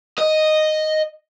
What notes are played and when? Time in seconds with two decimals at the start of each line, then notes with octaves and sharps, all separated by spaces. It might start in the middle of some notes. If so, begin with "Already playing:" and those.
0.18 D#5